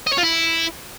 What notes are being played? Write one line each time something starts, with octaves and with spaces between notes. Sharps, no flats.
D#5
C#5
F4
E4